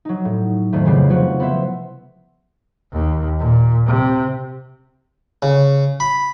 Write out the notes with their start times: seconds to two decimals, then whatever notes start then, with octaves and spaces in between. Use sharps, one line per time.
0.05 F#3 D#4
0.25 A2
0.72 F2 A2 D#3 G3 A3
0.85 F2 C#3 G3 B3 G4 C7
1.10 C3 F3 F#3 F#4
1.40 B3 E4 C5 E5
2.93 D#2
3.40 A#2
3.87 C3
5.42 C#3
6.00 B5